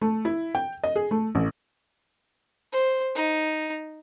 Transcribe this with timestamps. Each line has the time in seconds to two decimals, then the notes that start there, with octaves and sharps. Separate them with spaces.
0.01 A3
0.25 E4
0.55 G5
0.84 D#5
0.96 G#4
1.11 A3
1.35 A1
2.72 C5
3.15 D#4